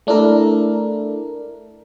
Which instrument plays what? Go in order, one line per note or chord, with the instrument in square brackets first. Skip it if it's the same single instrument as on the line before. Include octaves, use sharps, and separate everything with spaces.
[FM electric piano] A3 D4 E4 A4 A#4